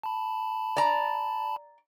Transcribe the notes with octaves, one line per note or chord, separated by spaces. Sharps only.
A5 B5
D5 A#5